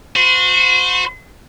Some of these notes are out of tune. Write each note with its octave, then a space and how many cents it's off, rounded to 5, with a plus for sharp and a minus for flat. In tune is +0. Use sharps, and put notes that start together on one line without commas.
F#4 -35 C5 -30